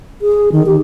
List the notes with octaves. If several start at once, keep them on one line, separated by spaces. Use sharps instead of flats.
G#4
D#3
G4